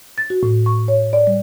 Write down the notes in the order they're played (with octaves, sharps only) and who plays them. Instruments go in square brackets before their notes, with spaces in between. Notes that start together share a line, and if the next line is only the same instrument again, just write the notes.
[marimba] A6
F#4
A2
C#6
C#5
D5
G3